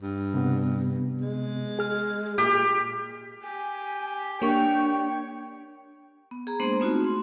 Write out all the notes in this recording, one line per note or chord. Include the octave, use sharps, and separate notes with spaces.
G2
C3 B3
G#3
G#4 F6
A#2 G4
G4 G#5
A#3 D4 G4 C#5 G5 C#6
B3
G#4 A#5
G#3 A#3 B3 D4 C5 C6
A3 B3 C4 D#4 F4 F#4
C6